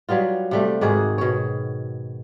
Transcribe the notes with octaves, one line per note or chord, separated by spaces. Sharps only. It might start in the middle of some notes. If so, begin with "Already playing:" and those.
F#3 G3 B3 F4
C3 G3 A3
G#2 D#3 F#4 G#4
B2 C#5